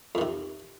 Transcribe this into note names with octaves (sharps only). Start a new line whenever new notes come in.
F2 C3 D#3